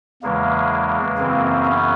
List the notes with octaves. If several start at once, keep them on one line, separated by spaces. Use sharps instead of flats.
E2 C#3 E3 G#3 A#3
F#2 C#3 E3 A#3 C4
B3 C#4